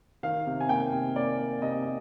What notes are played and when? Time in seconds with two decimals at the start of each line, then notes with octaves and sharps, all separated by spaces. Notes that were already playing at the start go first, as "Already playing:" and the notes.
0.23 D#3 F5
0.47 C3
0.61 G#5
0.69 A#3 G5
0.93 C3
1.16 A#3 D5
1.39 A#3
1.62 C3 D#5
1.85 C3